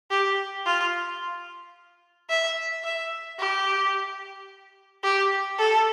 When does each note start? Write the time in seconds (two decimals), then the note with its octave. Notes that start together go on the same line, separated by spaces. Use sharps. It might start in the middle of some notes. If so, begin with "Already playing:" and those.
0.11 G4
0.66 F4
2.29 E5
2.84 E5
3.39 G4
5.03 G4
5.58 A4